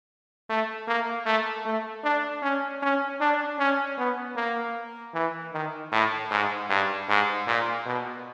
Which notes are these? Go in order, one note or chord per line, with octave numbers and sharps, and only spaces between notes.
A3
A#3
A3
A3
D4
C#4
C#4
D4
C#4
B3
A#3
E3
D#3
A2
G#2
G2
G#2
A#2
B2